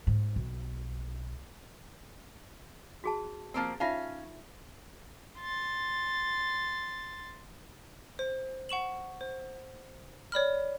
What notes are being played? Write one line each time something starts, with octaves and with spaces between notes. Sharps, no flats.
G#2
B1
F#4 G#4 A5
F3 A#3 C4
C#4 D#4 F4 E5 F5
C6 A6
C5
F#5 C#6 E7 F#7
C5
C#5 D5 B5 F6